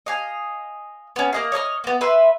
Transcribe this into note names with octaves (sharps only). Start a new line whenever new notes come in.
D#5 F5 G#5
B3 C#4
A#3 D#5 F5
C#5 D#5 A#5 F6
A#3 B3
B4 E5 C6